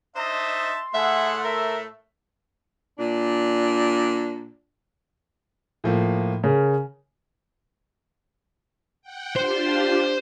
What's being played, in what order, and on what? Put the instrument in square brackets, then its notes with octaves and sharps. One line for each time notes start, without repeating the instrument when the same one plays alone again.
[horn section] D4 C5 D#5 [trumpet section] D#4 E5 A5 [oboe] C6
[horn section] A2 A3 [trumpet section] G#4 F#5 [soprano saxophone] E5
[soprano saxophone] A#4 [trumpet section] E5
[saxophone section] A#2 D4
[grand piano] A2 F3 A#3
[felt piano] C#3 [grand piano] A#4
[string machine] F#5 G5
[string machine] D4 F4 G4 [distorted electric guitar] C5